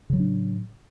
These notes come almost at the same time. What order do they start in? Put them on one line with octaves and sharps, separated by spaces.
C#3 F#3 A2 D4